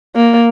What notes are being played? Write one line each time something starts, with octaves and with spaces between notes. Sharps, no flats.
A#3